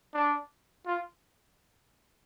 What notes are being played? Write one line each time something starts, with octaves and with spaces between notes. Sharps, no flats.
D4
F4